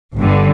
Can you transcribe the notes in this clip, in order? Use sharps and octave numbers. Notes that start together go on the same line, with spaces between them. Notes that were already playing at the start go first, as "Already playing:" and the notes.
G1 G2 D3